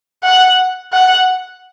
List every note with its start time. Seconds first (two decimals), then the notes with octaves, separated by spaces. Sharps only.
0.23 F#5
0.93 F#5